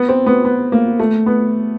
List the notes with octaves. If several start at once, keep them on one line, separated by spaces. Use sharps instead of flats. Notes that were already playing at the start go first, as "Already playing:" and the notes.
Already playing: B3
C4
B3
B3
A#3
A3
B3